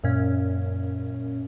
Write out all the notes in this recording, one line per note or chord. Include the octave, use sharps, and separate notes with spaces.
F#2 A#2 C#4